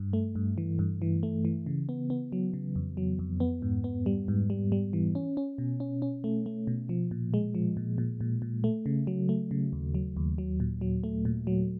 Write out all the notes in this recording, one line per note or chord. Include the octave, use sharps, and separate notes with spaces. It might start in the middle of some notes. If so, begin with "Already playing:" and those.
Already playing: G2
A3
G2
E3
G2
E3
A3
E3
C#3
B3
B3
F#3
C#3
F2
F#3
F2
B3
G#2
B3
G3
G#2
G3
G3
E3
C#4
C#4
B2
C#4
C#4
A3
A3
B2
F3
A#2
G#3
F3
A#2
A#2
A#2
A#2
A3
C#3
F#3
A3
C#3
D#2
F#3
D#2
F#3
A#2
F#3
A3
A#2
F#3